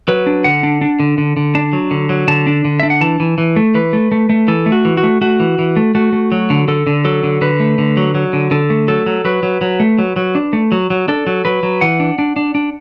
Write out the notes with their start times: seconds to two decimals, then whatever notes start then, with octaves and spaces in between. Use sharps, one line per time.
0.08 F#3 B4
0.27 D4
0.44 D3 F#5
0.63 D4
0.81 D4
1.00 D3
1.18 D3
1.37 D3
1.55 D4 A5
1.73 F#3
1.91 D3
2.09 F#3
2.28 D3 A5
2.47 D4
2.65 D3
2.80 D4 E5
2.90 F#5
3.01 E3 A5
3.20 E3
3.38 E3
3.56 A3
3.74 E3 B4
3.93 A3
4.12 A3
4.29 A3
4.48 E3 A4
4.66 A3
4.72 F#4
4.85 E3
4.97 F#4
5.03 A3
5.21 A3 F#4
5.40 E3
5.59 E3
5.76 A3
5.95 A3 F#4
6.13 A3
6.32 F#3
6.50 D3
6.68 D3 A4
6.87 D3
7.05 F#3 A4
7.24 D3
7.41 D3 B4
7.60 A3
7.78 D3
7.97 F#3
8.15 F#3
8.33 D3
8.51 D3 A4
8.70 A3
8.88 F#3 A4
9.06 F#3
9.25 F#3 B4
9.43 F#3
9.61 F#3
9.80 A3
9.99 F#3
10.16 F#3
10.35 D4
10.53 A3
10.72 F#3
10.90 F#3
11.08 D4 A4
11.27 F#3
11.45 F#3 B4
11.63 F#3
11.81 E3 F#5
12.00 D4
12.19 D4
12.36 D4
12.55 D4